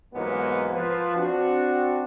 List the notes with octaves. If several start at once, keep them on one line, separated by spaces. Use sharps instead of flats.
G#2 C3 E3 F#3 A#3 B3
F3 B4
C4 D4 F#4